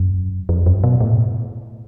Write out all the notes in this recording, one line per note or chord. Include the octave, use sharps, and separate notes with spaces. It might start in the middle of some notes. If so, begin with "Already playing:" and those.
Already playing: F#2
F2
F#2
B2
A2